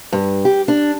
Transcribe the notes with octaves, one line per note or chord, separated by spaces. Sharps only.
G2
G4
D4